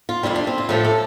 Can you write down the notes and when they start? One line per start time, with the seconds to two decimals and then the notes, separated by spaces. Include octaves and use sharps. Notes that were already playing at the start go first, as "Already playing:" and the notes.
0.09 F4
0.23 F2 C3 G3 E4
0.36 D4
0.47 C4
0.58 F4
0.69 A2 F3 A3 G4
0.84 A4